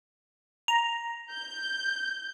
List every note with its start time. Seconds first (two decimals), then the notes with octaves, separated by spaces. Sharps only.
0.68 A#5
1.32 G6